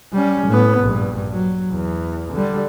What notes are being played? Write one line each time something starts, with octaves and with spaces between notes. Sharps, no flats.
G3 C#4
A2 B3
A#1 G2
F#3
E2
D3 G3